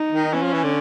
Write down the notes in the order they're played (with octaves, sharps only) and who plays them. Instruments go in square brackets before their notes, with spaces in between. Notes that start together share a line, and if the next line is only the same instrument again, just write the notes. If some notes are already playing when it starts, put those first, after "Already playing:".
Already playing: [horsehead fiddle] D#4
[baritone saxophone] D#3
[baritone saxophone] E3 [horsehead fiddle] C#4
[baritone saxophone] F3
E3
D3